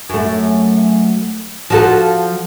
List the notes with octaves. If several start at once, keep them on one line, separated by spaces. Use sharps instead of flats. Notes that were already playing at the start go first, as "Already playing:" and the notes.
F#2 A3
F3 F#4 A4